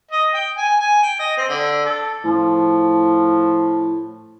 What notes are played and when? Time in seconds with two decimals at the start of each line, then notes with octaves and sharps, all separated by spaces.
0.11 D#5
0.34 G5
0.57 G#5
0.80 G#5
1.03 G5
1.19 D#5
1.37 C4
1.49 D3
1.86 A4
2.25 A2 F3